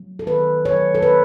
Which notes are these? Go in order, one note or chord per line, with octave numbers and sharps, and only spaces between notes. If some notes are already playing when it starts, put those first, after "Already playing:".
Already playing: F#3 A3
A4
D#3 B4
F#3 A3 C#5
A4
D#3 B4